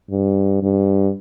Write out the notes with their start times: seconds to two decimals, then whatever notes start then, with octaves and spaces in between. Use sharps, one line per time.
0.11 G2
0.63 G2